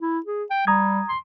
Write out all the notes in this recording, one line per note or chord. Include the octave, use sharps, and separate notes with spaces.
E4
G#4
G5
G3 A#5 D#6 G#6
C6